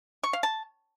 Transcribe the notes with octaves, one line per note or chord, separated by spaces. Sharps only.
C#6
F5
A5